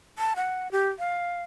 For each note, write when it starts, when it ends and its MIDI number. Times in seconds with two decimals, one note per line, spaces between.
0.18 0.34 81
0.36 0.71 78
0.72 0.89 67
0.99 1.43 77